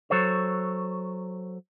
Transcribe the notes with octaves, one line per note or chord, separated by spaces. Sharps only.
F#3 A4 C5 C#5